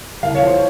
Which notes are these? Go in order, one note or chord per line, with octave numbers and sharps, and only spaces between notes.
C2 F5
C#5
F3
C5